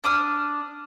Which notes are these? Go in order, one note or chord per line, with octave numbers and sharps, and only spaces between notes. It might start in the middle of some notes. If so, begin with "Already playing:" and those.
D4 D6 D#6 F6